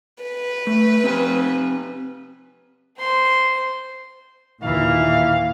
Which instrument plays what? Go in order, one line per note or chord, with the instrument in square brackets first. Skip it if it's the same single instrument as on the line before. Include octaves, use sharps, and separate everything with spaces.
[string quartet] B4
[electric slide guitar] A3
C4 G4 G#5
[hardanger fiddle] C5 C6
[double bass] D#2 E4 [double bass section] A#2 [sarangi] E3 [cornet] F5